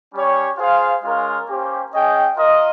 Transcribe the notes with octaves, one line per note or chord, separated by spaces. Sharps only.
G3 C#4 G4 C#5
F4 G#4 C5 F5
G#3 C#4 F4 A#4 F5
A#3 C#4 G4 C5
C#4 G#4 D#5 G5
F4 A#4 D#5